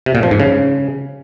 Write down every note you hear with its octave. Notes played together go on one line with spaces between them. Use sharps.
C3
A#2
F3
G#2
C#3